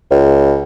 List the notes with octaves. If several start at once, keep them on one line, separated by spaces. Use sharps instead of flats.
C#2